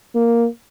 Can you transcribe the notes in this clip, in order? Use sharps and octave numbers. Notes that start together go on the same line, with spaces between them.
A#3